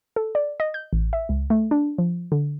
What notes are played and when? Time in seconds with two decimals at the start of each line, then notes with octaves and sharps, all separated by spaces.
0.16 A4
0.35 D5
0.60 D#5
0.74 G6
0.93 A1
1.13 E5
1.29 C#2
1.50 A3
1.71 D4
1.98 F3
2.32 D3